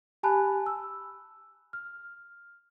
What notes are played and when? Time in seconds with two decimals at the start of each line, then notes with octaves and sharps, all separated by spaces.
0.23 G4 G#5 A5 B5 F#6
0.66 E6
1.73 F6